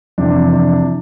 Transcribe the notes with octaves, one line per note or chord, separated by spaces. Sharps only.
F2 C3 E3 D4
D4